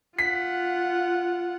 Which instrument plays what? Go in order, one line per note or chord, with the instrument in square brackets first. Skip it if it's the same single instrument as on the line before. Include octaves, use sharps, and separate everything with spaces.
[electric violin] F4 F#5 [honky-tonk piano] B6